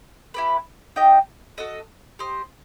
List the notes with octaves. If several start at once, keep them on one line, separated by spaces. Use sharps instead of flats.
E4 G4 B4
D#4 G4 D#5 G5
F#4 A4 D#5
G4 C5 D#5